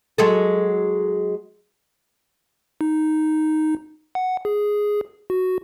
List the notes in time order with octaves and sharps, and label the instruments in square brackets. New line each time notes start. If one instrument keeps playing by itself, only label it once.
[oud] F#3 G#3 A4
[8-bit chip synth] D#4
F#5
G#4
F#4